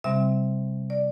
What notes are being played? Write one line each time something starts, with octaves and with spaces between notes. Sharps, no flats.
C3 G3 C4 E5
D5